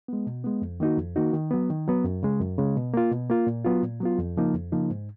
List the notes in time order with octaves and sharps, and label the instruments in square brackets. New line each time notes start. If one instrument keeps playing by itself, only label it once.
[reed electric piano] G#3 B3
B2
G#3 B3
F2
D#3 A#3 D#4 F#4
F2
D#3 A#3 D#4 F#4
D#3
F#3 B3
D#3
F#3 B3
F#2
C#3 G#3
F#2
C#3 G#3
B2
A#3 F4
B2
A#3 F4
A#2
F#3 B3 F4
A#2
F#3 B3 F4
F2
C#3 F3 A#3 D#4
F2
C#3 F3 A#3 D#4
G#2